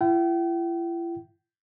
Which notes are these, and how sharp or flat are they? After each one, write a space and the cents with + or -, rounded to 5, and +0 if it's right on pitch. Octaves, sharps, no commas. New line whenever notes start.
E4 +45 G5 -40